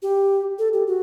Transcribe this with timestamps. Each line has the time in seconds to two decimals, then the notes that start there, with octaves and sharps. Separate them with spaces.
0.02 G4
0.59 A4
0.74 G4
0.88 F#4